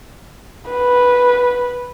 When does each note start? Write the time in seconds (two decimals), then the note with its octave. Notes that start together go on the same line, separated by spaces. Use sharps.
0.70 B4